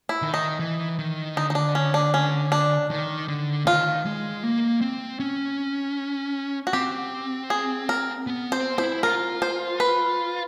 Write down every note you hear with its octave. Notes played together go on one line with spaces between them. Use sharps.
E4
D#3
D#4
E3
D#3
D3 D#4
D#4
D4
C#4
D4
C#4
D4
D#3
D3
D#3 F4
G#3
A#3
C4
C#4
F#4
C4 G4
G#4
A#4
B3
C4 C5
E4 C5
F4 A#4
C5
B4